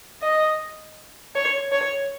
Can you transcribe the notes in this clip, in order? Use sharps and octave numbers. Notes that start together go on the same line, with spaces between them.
D#5
C#5
C#5